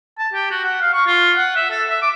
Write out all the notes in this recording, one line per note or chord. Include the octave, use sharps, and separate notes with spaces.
A5
G4
F#4
F#5
F5
C#6
F4
F#5
E5
A4
E5
D6